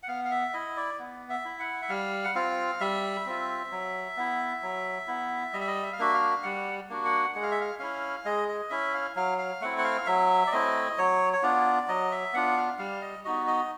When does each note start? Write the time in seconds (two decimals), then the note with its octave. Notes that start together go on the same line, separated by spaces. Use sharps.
0.03 F#5
0.08 B3 F5
0.25 F5
0.31 E5
0.53 E4 D#5
0.77 D5
0.99 B3
1.30 E5
1.45 E4
1.60 F#5
1.82 E5
1.89 G3 F5
2.24 F#5
2.35 C4 F4 F5
2.80 G3 E5
3.26 C4 F4
3.72 F#3
4.16 B3 E4
4.62 F#3
5.07 B3 E4
5.53 G3 D#5
5.61 E5
5.67 D#5
5.83 E5
5.92 F5
5.99 A#3 D4 F#4 E5
6.14 F5
6.43 G3 F#5
6.89 A#3 D4 F#4
7.05 F#5
7.35 G#3 F#5
7.43 F5
7.51 E5
7.61 F5
7.79 C#4 E4 F5
8.25 G#3 D#5
8.49 D#5
8.70 C#4 E4 E5
8.94 F5
9.15 F#3 F5
9.38 F5
9.61 A3 C4 E4 F#5
9.78 F#5
9.84 F5
10.06 F#3 E5
10.47 D5
10.52 A3 C4 E4 D#5
10.98 F#3 C#5
11.33 C#5
11.43 B3 D4 F4 D5
11.88 F#3 D#5
12.12 E5
12.33 B3 D4 F4 F#5
12.57 F5
12.78 G3 F5
13.02 D#5
13.25 B3 D#4 F#4 D#5
13.47 D#5